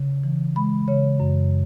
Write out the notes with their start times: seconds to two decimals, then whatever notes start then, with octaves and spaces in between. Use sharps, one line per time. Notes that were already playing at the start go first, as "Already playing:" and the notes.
Already playing: C#3
0.24 E3
0.56 G#3 B5
0.88 C#3 C#5
1.20 F#2